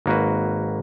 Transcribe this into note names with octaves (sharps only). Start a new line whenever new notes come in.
G#1 A#3 F#4 B4